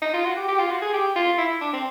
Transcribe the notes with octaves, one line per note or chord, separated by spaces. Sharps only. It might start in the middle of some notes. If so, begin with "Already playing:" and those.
D#4
F4
F#4
G4
G4
F4
F#4
G#4
G4
F4
E4
D4
C4